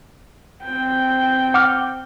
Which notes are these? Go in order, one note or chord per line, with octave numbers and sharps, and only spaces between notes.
C4 G5
F#5 D6 F6